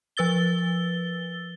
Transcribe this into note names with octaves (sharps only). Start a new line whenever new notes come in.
F3 B4 E6 A6 G7